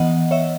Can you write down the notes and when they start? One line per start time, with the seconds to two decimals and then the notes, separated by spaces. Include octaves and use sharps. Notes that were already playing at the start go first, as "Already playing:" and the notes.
Already playing: E3 B3 D#5 F#5
0.31 C#5 E5